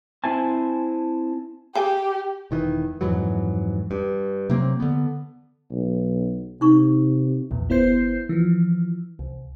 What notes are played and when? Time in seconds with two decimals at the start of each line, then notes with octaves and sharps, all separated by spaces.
0.24 C4 E4 C5 E5 G#5 A5
1.75 G4 G#4 G5 G#5
2.51 E1 D#3 E3
3.01 F2 G#2 E3 F#3
3.91 G2
4.50 C3 F#3 A#3 C4
4.80 D3 B3
5.71 B1
6.61 C3 D#4 C#6
7.51 B1 E2 A#2
7.69 G1 B3 E4 C5 G6 C7
8.29 E3 F3
9.19 C2